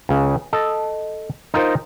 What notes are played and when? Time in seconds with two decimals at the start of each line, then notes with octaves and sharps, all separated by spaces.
0.09 C#2 C#3
0.53 A4 D#5
1.54 D#4 F4 A#4 C5